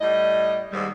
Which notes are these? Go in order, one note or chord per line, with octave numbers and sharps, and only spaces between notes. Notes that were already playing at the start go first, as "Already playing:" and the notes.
A2 G3 D#5
D#2 G#2 G3